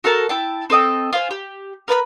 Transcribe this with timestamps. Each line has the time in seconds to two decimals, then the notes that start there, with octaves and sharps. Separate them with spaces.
0.04 F#4 A4 A#4 A5
0.29 E4 G5 A5
0.70 C4 A4 D#5 G5
1.13 F4 C5 G#5
1.31 G4
1.88 A#4 B4 A5 B5